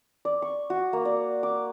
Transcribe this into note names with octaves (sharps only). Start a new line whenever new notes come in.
D5
C#6
F#4
A#3
D5
D6